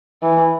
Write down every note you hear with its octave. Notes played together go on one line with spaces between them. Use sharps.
E3